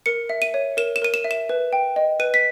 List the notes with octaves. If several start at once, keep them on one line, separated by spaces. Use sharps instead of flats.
A#4 C#7
E5
D#7
C#5
A#4 E7
E7
A#4 D#7
E7
E5
E7
B4
G5
D#5
B4 D#7
B6